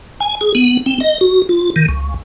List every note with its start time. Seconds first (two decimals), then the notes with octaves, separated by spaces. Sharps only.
0.20 G#5
0.41 G#4
0.55 B3
0.86 C4
1.00 D#5
1.21 F#4
1.49 F4
1.76 D#3
1.89 C#2